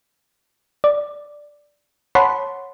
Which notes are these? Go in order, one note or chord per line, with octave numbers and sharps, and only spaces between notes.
D5
C#5 F#5 A5 B5 C6